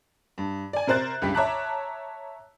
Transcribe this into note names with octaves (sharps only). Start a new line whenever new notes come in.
G2
D5 G#5
C3 A#4 C5 F#6 A6
C#2 G2 G4 B6
C#5 E5 A5 A#5 D6 F#6